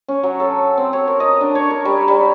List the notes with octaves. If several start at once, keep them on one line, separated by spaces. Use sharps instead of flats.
C#4
F#3
A4
C4
C#5
A#4
D#5
D4
C#5
A#4
G3
G3